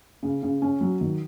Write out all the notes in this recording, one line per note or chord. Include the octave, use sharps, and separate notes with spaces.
C#3
C#3
C#4
F#3
D#3